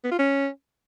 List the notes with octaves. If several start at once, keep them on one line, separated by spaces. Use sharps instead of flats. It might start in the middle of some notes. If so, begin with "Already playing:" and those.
B3
F4
C#4